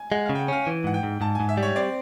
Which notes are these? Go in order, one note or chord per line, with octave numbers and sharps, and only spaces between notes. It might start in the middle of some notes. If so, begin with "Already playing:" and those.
Already playing: G#5
G#3 F#5
F5
C#3
G5
F#5
C#4 F5
E3
G#2 F#5
G5
G#2
G#2 A5
G#5
G#2
E5
G3
C#5
C4 D5